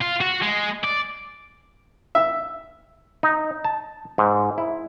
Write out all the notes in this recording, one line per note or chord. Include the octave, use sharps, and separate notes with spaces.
F4
F#4
G#3
D5
E5
D#4
A5
G#2
E4